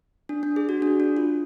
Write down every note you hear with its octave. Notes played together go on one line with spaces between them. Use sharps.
D4
D4
G#4
F#4
D4
D4
F4